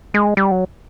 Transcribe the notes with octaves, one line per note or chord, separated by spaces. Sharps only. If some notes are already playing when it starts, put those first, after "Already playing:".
G#3
G3
F#3